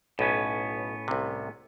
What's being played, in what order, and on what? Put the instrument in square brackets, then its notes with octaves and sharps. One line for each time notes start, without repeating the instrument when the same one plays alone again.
[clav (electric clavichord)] B1 [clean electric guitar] A2 B3 C#4
[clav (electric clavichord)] C2 C3